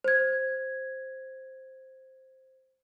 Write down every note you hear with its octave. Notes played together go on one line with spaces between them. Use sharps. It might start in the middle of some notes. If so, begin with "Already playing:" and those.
C5 G#6